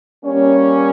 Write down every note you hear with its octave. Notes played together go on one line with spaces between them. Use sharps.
G3 A#3 C#4